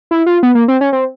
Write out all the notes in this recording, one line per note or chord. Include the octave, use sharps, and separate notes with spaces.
E4
F4
B3
A#3
C4
C#4
C4